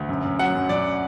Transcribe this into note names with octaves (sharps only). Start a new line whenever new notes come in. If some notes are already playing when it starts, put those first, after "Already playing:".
Already playing: D2
F#2
F#2
F#3 F#5
F#2
F#2 D5